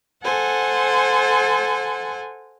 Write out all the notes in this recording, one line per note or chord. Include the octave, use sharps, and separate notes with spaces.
A4 C5 F#5 G#5